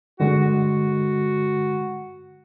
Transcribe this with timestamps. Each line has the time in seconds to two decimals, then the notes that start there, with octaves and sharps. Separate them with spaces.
0.20 G2 D3 G#3 F#4